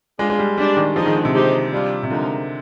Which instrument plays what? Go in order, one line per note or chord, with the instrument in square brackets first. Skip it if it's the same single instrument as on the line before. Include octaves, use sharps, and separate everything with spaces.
[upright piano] G#3 [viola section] D4 F4 G#4
[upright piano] G#3
G3
[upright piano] G3 [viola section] D4 G4 D5
[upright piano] D#3
[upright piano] F3 [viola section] G#3 D#4 G#4 D#5
[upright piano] D#3
D3
C3
[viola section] G#3 D#4 G4 C5
G3 D4 F4
[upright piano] C3
[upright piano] D3 [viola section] F3 G#3 D#4 A#4